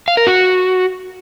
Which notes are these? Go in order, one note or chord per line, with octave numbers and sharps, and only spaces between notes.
F5
A#4
F#4